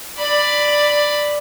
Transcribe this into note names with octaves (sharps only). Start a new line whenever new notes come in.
D5 B5